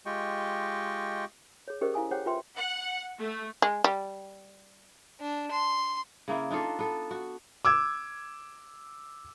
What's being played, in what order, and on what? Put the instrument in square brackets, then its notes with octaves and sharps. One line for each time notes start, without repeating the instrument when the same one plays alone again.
[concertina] G#3 F4 G4 D#5 G5 C#6
[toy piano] G#4 C#5
C#4 G4 G#4 A#4 C5 D#5
E4 F5 G#5 D#6
G4 G#4 C5 C#5 F#5 G5
F4 B4 E5 G5 C6
[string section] F#5
A3
[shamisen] G#3
G3
[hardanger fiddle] D4
C6
[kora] C#3 A#3 E4
D4 D#4 F4 A4
B3 A4
F#4
[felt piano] D6 E6 G#6